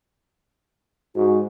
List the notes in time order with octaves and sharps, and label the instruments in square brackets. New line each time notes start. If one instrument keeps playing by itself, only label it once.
[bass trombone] G#2 [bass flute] F#4